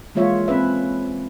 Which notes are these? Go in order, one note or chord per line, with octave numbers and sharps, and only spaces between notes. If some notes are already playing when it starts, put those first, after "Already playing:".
E3 G#3 A#3 F4 C#5 E5
C4 C#4 B4 E5